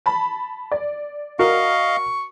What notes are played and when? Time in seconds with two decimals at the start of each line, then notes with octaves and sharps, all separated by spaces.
0.06 A5 B5
0.72 D5
1.39 F#4 A#4 D#5 F5 C#6